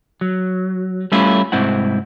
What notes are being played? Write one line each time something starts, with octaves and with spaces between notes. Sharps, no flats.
F#3
G3 A3 C#4 E4 F4
C2 G#2 C4 E4 F#5